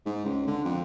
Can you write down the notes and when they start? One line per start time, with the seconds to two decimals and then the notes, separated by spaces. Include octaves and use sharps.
0.06 G#2
0.25 C#2
0.47 D3
0.65 F2